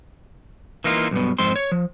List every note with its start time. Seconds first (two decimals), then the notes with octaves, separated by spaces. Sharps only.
0.84 E3 A#3 D#4 F4
1.11 B1 G2 B2
1.38 F2 G#2 C4 C6
1.56 C#5
1.72 F3